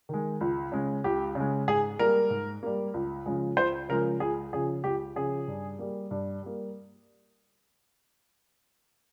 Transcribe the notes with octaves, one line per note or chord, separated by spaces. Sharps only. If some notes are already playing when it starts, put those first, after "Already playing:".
D#3 G#3
C#2
C#3 G#3
C#2 G4
C#3 G#3
G#2 G#4
G3 A#3 A#4
G#2
G3 A#3
C#2
C#3 F3 G#3
C#2 C5
C#3 F3 G#3 A#4
C#2 G#4
C#3 F3 G#4
C#2 G4
C#3 F3 G#4
G2
G3 A#3
G2
G3 A#3